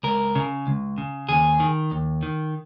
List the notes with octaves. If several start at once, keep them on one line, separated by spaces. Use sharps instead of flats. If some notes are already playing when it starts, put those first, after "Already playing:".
C#2 A#4
C#3
C#2
C#3
D#2 G#4
D#3
D#2
D#3